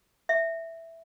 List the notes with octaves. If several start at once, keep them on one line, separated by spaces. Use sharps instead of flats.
E5